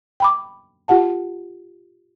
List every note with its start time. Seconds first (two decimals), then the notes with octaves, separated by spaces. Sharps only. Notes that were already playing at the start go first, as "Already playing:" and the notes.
0.20 G5 B5 D6
0.88 F4 G4 F#5 A5